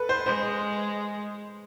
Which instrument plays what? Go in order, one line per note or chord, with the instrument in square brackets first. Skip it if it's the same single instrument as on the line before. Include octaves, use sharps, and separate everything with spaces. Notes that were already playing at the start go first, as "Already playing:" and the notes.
Already playing: [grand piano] A4 B4
C5
[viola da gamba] G#3 [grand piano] C5